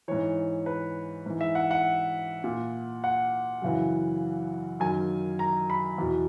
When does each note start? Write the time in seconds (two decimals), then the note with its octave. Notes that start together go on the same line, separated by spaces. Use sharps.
0.08 G#2 E3 C#5
0.66 B4
1.26 G#2 E3
1.41 E5
1.55 F#5
1.71 F#5
2.44 A#2
3.04 F#5
3.62 F#2 C#3 E3
4.80 F#2 D#3 G#5
5.39 A#5
5.70 B5
5.98 E2 B2